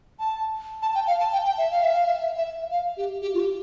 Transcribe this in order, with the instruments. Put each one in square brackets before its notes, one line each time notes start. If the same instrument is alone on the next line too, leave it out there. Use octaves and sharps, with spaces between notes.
[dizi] A5
A5
G5
F5
A5
G5
G5
E5
F5
E5
F5
E5
E5
E5
F5
G4
G4
F4
G4